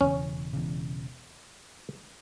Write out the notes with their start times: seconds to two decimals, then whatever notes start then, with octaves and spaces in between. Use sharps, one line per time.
0.01 E1 E2 C#3 C#4
0.53 E1 E2 C#3